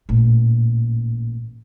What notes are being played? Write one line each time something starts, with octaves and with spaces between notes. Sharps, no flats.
A1 A#2